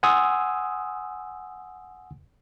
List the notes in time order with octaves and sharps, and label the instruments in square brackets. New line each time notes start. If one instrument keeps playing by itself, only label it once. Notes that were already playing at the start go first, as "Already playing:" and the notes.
[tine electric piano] F#5 G#5 C6 D#6 E6